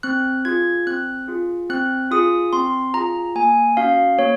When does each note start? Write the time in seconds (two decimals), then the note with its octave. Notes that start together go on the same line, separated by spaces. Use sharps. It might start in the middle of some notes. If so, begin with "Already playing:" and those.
0.03 C4 F#6
0.45 F4 G#4 G#6
0.87 C4 F#6
1.28 F4 G#4
1.70 C4 F#6
2.11 F4 G#4 D#6
2.53 C4 C6
2.94 F4 G#4 A#5
3.35 A#3 G#5
3.77 C#4 F#4 F5
4.18 A#3 C#5